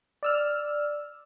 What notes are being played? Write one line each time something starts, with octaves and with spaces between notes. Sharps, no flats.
D5 E6 F6